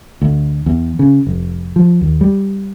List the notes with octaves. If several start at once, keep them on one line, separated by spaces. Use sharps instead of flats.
D2
E2
C#3
F1
F3
D#2
G3